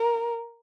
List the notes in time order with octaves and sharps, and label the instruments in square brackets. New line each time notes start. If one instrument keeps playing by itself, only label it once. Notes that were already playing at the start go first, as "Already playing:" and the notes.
Already playing: [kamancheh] A#4